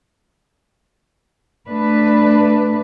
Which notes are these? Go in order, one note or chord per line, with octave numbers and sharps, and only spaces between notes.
A3 D4 B4